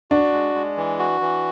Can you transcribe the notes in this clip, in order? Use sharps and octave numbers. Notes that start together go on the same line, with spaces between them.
D4 F#4
G#3
G#3
E3
F#4
E3